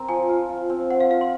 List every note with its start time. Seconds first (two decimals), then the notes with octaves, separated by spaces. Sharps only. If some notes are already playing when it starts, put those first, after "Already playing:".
Already playing: C4 A#4 A#5
0.09 F3 G#5
0.29 F4
0.49 F4
0.70 C4
0.90 C4 F#5
1.00 F5
1.11 F4 F5
1.21 C6